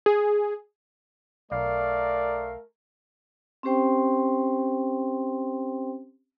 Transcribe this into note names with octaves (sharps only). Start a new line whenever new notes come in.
G#4
B1 A3 A#4 D5 F5
C4 C#4 G4 C5 G5 C6